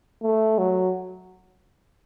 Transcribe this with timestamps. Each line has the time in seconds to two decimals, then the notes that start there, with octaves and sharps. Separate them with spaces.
0.23 A3
0.58 F#3